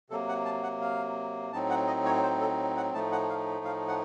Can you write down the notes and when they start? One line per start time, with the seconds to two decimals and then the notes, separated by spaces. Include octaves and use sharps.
0.10 C3 F#3 A#3 A4
0.29 F#5
0.45 A5
0.63 F#5
0.81 F5
1.53 A2 F#3 C4 D#4 A5
1.70 F#5
1.87 D#5
2.05 C#5
2.23 C5
2.41 A4
2.77 F#5
2.93 A2 F3 A3 D#4 A5
3.12 F#5
3.29 F5
3.65 F5
3.88 F#5